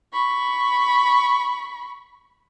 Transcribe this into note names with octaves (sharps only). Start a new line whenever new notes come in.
B5 C#6